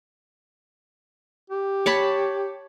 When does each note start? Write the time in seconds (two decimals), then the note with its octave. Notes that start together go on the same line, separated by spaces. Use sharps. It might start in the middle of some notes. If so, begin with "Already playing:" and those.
1.50 G4
1.86 C#5 A5 B5